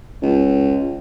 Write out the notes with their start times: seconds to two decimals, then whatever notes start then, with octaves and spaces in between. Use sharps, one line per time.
0.22 C#2